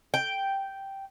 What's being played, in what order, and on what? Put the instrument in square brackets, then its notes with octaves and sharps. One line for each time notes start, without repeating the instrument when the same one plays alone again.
[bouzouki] G5